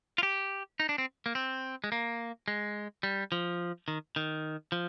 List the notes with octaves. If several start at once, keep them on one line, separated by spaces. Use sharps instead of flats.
F4
G4
D#4
D4
C4
A#3
C4
G#3
A#3
G#3
G3
F3
D#3
D#3
F3